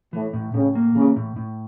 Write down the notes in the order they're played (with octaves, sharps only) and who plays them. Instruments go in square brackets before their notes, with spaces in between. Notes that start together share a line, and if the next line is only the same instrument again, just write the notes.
[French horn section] A2 [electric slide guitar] E3
[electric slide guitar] A2
[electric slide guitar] A2 [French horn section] C#3
[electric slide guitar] A#3
[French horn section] C#3 [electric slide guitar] E3
[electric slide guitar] A2
A2